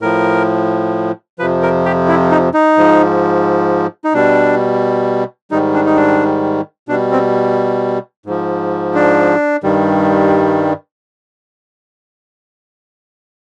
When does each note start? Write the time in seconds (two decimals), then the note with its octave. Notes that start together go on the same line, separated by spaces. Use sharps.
0.02 A2 F3 A#4
1.39 F2 C3 F3 B4
1.62 A#4
1.85 G4
2.08 E4
2.31 D#4
2.54 D#4
2.77 G#2 F3
4.04 D#4
4.14 B2 G3 D4
5.51 G#2 D#3 G3 D#4
5.74 D4
5.86 D#4
5.97 D4
6.89 B2 D4
6.92 G3
7.12 C4
8.26 G#2 F3
8.95 D4
9.63 G2 D#3 G3